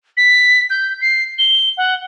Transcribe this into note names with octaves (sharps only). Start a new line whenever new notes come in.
B6
G6
C7
G7
F#5